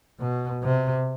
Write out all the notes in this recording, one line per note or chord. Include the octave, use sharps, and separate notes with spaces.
B2
C3